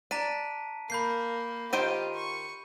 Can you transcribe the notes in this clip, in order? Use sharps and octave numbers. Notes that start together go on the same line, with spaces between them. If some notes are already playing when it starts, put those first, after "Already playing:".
D4 A#5 B6 D#7
A#3 B5 G6 C7
D#3 F4 G4 C5 G5 D#7
C#6